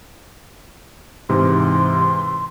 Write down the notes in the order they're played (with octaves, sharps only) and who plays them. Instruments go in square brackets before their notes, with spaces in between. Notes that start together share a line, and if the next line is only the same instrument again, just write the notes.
[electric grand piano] G#2 C3 E3 [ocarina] C6